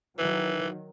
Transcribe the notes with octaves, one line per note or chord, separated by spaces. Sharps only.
D#3 E3 F#3